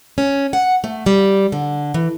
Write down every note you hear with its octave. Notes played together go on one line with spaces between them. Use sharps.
C#4
F#5
A3
G3
D3
E3